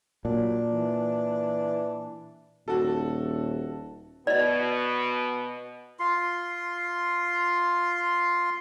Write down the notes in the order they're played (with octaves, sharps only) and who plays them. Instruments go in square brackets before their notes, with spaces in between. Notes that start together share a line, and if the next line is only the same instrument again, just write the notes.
[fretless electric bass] A#2 [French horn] F#3 [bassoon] D4
[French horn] E3
[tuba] D#1 [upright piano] F#4 A4
[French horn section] B2 B3 [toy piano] D5 D#5
[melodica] F4 C6